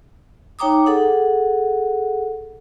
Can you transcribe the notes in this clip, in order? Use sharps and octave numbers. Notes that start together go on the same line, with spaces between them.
D#4 C#5 G5 A#5 D6 D#6
G#4 A4 F#5